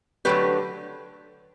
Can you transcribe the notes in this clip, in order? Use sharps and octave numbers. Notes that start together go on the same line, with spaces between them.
D3 F#3 A3 G4 B4